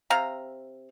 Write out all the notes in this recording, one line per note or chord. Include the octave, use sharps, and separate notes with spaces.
C3 F5 A#5